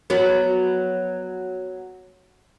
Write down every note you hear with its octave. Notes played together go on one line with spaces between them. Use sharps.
F#3 B3